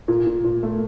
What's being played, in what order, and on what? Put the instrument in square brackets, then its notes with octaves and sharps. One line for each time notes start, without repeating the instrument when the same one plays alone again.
[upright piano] A#2
A#2
A#2
A3